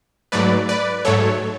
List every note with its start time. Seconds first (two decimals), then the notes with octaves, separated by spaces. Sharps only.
0.32 G#2 F#3 A3 B4 D5
0.69 B4 D5
1.05 G#2 F#3 A3 A4 C#5